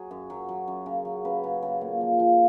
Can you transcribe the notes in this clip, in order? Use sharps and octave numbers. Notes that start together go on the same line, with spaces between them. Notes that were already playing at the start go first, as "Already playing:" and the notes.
Already playing: F#3 F#4 G#4
F#2
F#3
F#3
F#2
C#3
F#3
C#3 B4
C#3
C#3
A#2
F3
F3